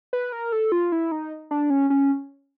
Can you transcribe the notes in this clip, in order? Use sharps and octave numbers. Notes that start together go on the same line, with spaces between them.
B4
A#4
A4
F4
E4
D#4
D4
C#4
C#4